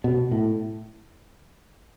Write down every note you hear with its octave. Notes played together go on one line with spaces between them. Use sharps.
B2
A2